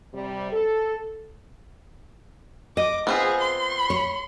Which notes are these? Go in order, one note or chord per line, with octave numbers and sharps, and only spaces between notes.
C3 G3
A4
D#5 D6
B3 C4 F4 G#4
C6
C#5